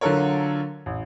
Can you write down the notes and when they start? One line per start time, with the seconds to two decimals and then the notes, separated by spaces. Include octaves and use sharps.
0.01 D3 F#3 F4 A4 A#4 C#5
0.86 A1